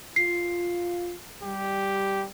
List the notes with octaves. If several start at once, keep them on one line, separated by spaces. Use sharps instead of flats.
F4 C7
G3 G4